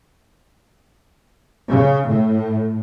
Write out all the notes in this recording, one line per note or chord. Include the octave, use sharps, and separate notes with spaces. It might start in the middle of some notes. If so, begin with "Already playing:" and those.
C#3
A2